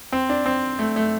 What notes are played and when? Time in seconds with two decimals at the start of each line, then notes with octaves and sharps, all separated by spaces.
0.12 C4
0.29 D4
0.46 C4
0.79 A3
0.96 A3